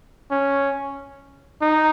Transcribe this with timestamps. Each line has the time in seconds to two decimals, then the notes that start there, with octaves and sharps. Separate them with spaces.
0.31 C#4
1.62 D#4